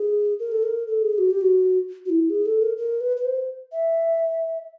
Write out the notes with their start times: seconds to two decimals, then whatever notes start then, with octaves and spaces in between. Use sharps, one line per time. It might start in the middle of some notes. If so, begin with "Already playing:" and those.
Already playing: G#4
0.39 A#4
0.52 A4
0.63 A#4
0.88 A4
1.02 G#4
1.18 F#4
1.31 G4
1.41 F#4
2.06 F#4
2.10 E4
2.30 G#4
2.46 A4
2.62 A#4
2.77 A#4
3.01 B4
3.17 B4
3.25 C5
3.72 E5